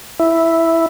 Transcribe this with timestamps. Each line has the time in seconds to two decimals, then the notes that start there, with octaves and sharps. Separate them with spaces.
0.19 E4